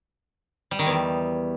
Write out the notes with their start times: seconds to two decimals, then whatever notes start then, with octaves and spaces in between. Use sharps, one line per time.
0.71 G3
0.79 D#3
0.87 E2